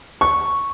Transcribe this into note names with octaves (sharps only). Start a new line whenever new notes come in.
C#6